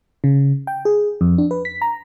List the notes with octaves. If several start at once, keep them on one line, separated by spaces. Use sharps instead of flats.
C#3
G5
G#4
F2
D4
B4
B6
A#5